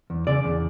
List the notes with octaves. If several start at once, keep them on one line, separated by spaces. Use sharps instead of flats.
E2
C#3 D5
E2